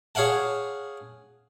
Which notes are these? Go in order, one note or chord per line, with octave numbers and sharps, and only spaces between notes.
G#4 C#5 F5 F#5 A5